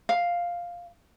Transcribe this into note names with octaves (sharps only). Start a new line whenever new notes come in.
F5